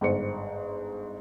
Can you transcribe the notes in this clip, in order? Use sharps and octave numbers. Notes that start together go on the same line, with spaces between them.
G1 G#2 C5 C#7